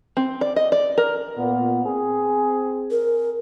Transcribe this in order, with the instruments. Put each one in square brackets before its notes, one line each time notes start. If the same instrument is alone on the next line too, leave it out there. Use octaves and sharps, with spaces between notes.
[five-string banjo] C4
D5
D#5
D5
A#4
[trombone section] A#2 B3
C4 G#4
[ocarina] A#4